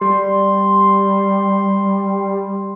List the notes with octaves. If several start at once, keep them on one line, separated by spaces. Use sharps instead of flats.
G3 C6